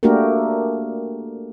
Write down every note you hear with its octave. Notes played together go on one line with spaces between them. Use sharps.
A3 A#3 D4 F#4 G4 A#4